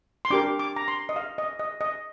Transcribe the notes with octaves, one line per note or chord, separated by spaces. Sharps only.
C6
D4 G4 A#4 D6
D6
A#5
C6
D#5
F5
D#5
D#5
D#5